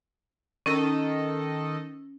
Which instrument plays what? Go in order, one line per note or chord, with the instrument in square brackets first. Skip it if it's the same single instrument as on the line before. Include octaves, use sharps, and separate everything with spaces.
[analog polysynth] D#3 A4 D#5 [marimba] C#4